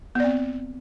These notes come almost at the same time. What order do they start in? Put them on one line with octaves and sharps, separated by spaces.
B3 D5 C4